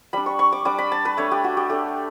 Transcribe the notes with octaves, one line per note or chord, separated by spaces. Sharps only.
G3 D4 B5
C#6
C#6
D6
G3 D4 D6
B5
A5
B4
A3 D4 C#5
G4
F#4
G4
A3 D4 A4